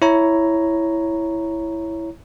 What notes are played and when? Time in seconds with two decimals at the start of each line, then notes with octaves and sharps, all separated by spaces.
0.02 E4 C#5 A#5